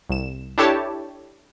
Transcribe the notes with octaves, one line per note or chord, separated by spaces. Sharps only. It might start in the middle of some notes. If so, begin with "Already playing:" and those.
C2 E7
D4 E4 G4 A4 C#5 A5